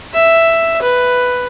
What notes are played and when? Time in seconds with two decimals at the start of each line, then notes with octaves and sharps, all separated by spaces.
0.14 E5
0.82 B4